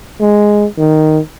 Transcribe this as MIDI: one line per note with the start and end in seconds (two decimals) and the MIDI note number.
0.21 0.66 56
0.78 1.19 51